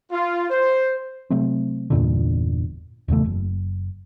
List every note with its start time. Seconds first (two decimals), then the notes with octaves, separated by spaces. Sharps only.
0.12 F4
0.50 C5
1.30 C3 F#3 A3 C4
1.90 G1 E2 A#2 D3
3.08 D#1 E2 C#3 A3
3.26 F#1